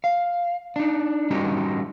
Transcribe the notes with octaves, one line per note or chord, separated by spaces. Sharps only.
F5
D4 D#4
G3 C#4 D#4 F#4 G4